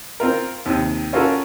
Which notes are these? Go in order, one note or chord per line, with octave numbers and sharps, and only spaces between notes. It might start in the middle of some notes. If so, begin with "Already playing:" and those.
C4 F4 A#4
D#2 C3
C#4 F4 F#4 A4 A#4